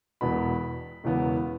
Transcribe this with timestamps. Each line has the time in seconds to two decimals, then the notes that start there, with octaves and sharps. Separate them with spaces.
0.21 E1 E2 B2 B3 B5
1.04 E1 E2 C#3 E3 B3